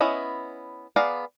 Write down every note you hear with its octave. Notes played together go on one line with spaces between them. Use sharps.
B3 C#4 E4 D#5
B3 G#4 D5 F5 A#5